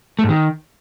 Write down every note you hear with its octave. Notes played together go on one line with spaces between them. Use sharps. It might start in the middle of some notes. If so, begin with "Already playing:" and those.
A3
G#2
D#3